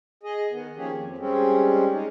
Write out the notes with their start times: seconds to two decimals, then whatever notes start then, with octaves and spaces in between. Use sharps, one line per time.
0.23 G#4 D#5
0.51 D#3 B3
0.76 D#3 F3 A#3 C#4 G4 G#4
0.94 F2
1.18 G3 G#3 C4 C#4
1.92 G#3 D#4